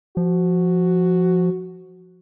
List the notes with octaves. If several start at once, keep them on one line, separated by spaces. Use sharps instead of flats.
F3 F#4